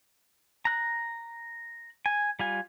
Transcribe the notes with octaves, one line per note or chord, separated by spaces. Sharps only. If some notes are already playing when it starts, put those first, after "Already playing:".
A#5 F#6
G#5
G3 F4 G#5